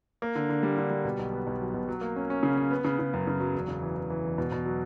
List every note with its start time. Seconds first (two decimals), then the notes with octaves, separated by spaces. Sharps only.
0.22 A#3
0.36 D3
0.49 D3
0.63 G3
0.78 D3
0.90 G3
1.05 B2
1.19 B1
1.33 B3
1.47 B1
1.61 F#3
1.74 B2
1.89 F#3
2.01 A#3
2.16 C#4
2.30 C#4
2.43 C#3
2.58 C#4
2.71 B3
2.85 C#3
2.99 C#3
3.13 F#2
3.27 C#3
3.40 F#3
3.55 E1
3.68 C#3
3.82 E3
3.96 E3
4.10 E3
4.24 E1
4.38 B2
4.52 B2
4.66 F#3